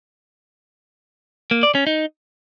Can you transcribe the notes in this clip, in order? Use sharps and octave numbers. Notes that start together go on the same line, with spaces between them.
A#3
D5
C#4
D#4